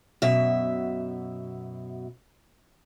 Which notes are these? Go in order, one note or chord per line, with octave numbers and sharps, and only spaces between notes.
F#2 B2 E5